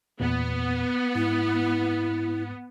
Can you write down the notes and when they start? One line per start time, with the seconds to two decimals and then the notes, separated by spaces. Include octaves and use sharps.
0.20 E2 A#2 B3
1.15 G#2 E4